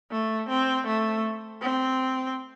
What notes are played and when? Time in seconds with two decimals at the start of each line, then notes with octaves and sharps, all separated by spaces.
0.11 A3
0.49 C4
0.87 A3
1.61 C4